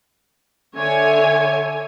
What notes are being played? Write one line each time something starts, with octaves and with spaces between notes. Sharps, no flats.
D3 C#5 E5 G#5